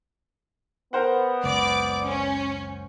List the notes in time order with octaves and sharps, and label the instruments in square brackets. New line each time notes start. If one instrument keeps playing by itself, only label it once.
[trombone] B3 [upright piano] A#4 C5 F#5
[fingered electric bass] F#1 C#2 [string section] D5 D6
[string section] C#4